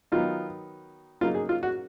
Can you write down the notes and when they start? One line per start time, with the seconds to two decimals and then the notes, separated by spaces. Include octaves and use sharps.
0.12 D#3 F#3 B3 D#4 F4
1.21 C#3 F#3 A#3 D#4 F4
1.35 G#4
1.49 F4
1.63 F#4